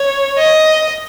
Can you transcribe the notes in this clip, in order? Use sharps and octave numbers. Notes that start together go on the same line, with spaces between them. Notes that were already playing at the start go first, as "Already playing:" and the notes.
Already playing: C#5
D#5